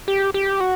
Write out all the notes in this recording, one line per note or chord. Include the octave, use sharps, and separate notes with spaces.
G4
G4
F#4